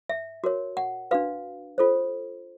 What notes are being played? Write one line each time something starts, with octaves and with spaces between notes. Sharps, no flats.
E5
F#4 A#4 C#5
F#5
D4 F#4 B4 F5
F4 A4 C5